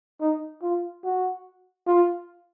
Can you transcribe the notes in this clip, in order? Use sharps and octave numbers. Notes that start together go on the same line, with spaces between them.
D#4
F4
F#4
F4